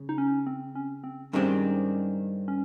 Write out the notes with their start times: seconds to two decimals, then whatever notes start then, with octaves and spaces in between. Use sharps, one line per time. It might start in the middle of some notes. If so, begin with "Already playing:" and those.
Already playing: C#3
0.09 D#4
0.18 C#4
0.47 C4
0.75 C#4
1.04 C4
1.33 G2 D#3 G#3 C4 C#4 G4
2.48 C#4